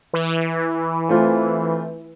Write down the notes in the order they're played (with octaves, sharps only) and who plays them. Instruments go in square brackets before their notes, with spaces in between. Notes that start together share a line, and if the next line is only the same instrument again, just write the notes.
[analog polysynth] E3
[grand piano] A3 C4 F4